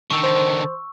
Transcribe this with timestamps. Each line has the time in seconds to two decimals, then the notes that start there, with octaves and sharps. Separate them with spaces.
0.10 D3 D#3 C#6 E6
0.24 C5